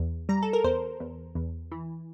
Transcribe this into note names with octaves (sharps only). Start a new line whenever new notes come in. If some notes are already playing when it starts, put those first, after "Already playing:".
Already playing: E2
G3 A#5
A4
A#4
E2 C5
E2
E2
E3